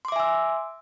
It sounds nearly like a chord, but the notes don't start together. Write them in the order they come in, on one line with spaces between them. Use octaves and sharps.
C6 D6 E5 G#5 E6